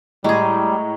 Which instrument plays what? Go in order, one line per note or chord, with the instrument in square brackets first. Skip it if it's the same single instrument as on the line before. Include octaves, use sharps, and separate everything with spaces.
[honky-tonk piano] A2 [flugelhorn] G3 [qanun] G#3 G#4 [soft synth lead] A#5